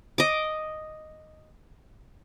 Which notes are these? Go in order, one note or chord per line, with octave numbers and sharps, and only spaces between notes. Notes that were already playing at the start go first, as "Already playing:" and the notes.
D#5 D6